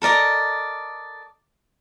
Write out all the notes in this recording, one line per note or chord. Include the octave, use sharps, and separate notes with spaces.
A4 A#4 D5 D#5